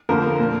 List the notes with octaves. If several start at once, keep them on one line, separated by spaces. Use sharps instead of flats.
F2 D3 F3 A#3 A#4
A#2 A#3